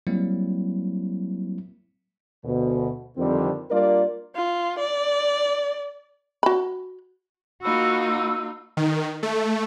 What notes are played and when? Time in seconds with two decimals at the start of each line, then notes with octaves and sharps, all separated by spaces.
0.07 F#3 G3 A#3 C4 E4
2.45 D2 B2
3.17 F2 D3 D#3 G3 C4
3.70 G3 A#3 D4 F4 A#4 D5
4.36 F4
4.79 D5
6.43 F#4 B5
7.63 A#3 D#4 F4 F#4 B5 E6
8.77 D#3
9.23 A3